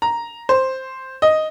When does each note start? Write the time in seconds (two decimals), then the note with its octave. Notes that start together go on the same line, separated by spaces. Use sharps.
0.02 A#5
0.49 C5
1.22 D#5